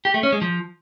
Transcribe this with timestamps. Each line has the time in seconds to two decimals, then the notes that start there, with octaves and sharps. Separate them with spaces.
0.05 G4
0.14 A3
0.23 C#4
0.32 G#3
0.42 F3